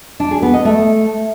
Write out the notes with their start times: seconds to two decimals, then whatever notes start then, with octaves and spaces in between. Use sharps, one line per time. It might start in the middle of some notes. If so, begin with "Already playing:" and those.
0.20 D4
0.31 G#4
0.42 B3
0.54 D#5
0.65 A3